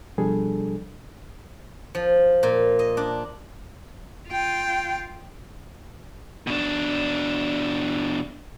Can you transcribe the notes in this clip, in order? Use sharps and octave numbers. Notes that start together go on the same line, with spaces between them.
B2 F3 G3 D4 G#4 A4
F3
A#2
D#5
D4
F4 G5
B2 D4